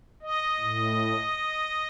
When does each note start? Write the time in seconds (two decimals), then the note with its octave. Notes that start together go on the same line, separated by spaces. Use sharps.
0.22 D#5
0.59 A2